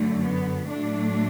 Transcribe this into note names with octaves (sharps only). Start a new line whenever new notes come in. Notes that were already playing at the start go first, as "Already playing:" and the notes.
Already playing: F#2 D3 F#3 A3
B3
A2 F#3 A3 D4